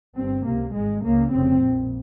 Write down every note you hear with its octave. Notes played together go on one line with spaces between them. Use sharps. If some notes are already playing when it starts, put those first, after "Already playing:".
G1 G2 C4
C#2 C3 A#3
G#1 G#2 G#3
C#2 C#3 A#3
F1 F2 C#3 C4
A#1 A#2